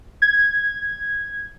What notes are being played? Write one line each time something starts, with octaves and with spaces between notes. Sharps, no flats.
G#6